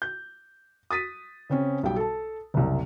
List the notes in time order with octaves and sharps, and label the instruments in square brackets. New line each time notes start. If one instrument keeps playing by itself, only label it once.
[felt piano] G6
D#6 A6 B6 D#7
C#3 C4 C#4
B1 G3 G5
A4 A5
F#1 C2